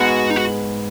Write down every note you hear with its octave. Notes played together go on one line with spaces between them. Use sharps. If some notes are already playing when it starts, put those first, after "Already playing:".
Already playing: G#2 G#3 B3 F#4 G#4
D#4
F#4